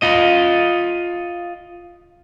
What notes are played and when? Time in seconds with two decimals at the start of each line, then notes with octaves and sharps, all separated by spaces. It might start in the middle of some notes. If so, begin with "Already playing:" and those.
0.02 F4 D#5